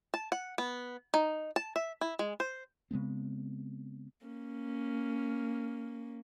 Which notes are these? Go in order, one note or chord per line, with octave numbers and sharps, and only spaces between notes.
A5
F#5
B3
D#4
A5
E5
E4
G#3
C5
C#3 G#3 B3 C4
A#3 C#4